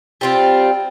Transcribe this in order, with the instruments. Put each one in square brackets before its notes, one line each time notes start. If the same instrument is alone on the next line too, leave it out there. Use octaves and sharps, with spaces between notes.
[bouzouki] G3 C4 F4